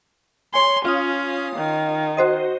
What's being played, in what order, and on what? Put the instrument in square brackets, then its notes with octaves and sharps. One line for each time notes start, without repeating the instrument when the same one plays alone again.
[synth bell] C#5 G#5 [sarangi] C6
[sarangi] C#4 [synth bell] F4 F5 D#6
[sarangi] D#3
[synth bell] F#4 C5 D#5